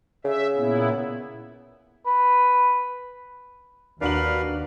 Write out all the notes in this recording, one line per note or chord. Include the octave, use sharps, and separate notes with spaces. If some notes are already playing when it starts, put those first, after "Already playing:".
C#3 E5
A#2 B3 E4
B4
D#2 D4 F#4 A#4 B4 F5 F#7